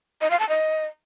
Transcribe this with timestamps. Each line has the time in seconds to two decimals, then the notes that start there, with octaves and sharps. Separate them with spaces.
0.21 D#5
0.30 F5
0.40 A5
0.49 D#5